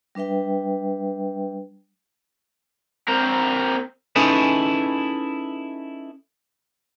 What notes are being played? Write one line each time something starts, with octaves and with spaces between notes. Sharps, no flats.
G3 D4 B4 E5 G5
C4 A#4
C#4 D#4 E4 G#4 A4 B4